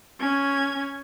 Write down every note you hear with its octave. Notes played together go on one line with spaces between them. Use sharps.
C#4 G#6